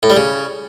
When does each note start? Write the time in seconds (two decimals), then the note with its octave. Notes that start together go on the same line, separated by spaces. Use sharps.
0.03 A2
0.10 G3
0.16 C#3